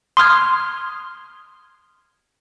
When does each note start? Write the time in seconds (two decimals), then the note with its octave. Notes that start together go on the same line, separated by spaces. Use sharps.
0.17 C6 D#6 F6 G#6